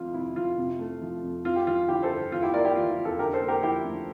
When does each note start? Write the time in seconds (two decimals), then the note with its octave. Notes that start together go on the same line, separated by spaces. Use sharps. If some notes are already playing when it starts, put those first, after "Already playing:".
Already playing: F1 F2 F4
0.14 C3 E4
0.36 F1 F4
0.58 C3
0.79 A3
1.02 F3
1.23 F2
1.45 F2 F4
1.56 G4
1.67 F3 F4
1.88 D3 E4 G4
2.03 A4 C5
2.10 G1
2.32 E2 F4
2.43 E4 G4
2.54 A#3 A#4 D5
2.64 E4 G4
2.76 E3 F4
2.90 F4
2.98 F1
3.05 F4 A4
3.19 D3 G4 A#4
3.33 A4 C5
3.41 A#3
3.48 G4 A#4
3.63 F3 E4 G4
3.84 D2